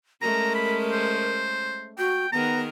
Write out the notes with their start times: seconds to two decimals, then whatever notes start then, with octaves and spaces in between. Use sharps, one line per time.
0.22 G#3 A3 C#4 A#4 A#5
0.55 B5
0.92 C5
1.98 F#4 G5
2.32 D#3 B3 G#4 A#4 A#5